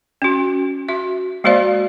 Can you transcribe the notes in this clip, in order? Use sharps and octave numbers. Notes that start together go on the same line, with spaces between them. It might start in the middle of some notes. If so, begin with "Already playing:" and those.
C#4 F#4
F#4 E5
G#3 A#3 F#4 C5 D5 F5